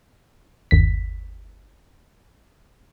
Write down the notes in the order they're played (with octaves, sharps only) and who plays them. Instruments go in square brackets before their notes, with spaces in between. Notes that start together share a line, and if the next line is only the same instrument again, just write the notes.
[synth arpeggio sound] G1 D#2 B6